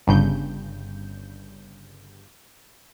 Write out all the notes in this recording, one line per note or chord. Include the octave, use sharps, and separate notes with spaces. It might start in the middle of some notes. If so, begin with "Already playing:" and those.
G1 G2 C#3 G6